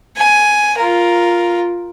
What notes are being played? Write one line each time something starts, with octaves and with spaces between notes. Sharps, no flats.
G#5
F4 A#4